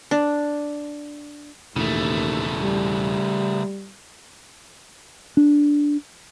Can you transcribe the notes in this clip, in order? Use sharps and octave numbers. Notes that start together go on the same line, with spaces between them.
D4
E1 D#2 A2 C#3 A3
G3
D4